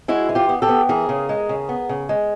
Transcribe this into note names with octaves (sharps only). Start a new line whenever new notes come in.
G#3 E4 F#4
E3
F4 G4
B3
G4 A4
B3
E3 G#4 A#4
C#3
G#3
C#3
B3
C#3
G#3